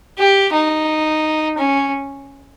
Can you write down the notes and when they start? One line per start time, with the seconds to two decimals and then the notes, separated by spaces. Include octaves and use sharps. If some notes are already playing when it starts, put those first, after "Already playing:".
0.18 G4
0.53 D#4
1.58 C#4